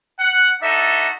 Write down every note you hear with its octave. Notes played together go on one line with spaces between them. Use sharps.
F#5
D4 D#4 F#4 A4 E5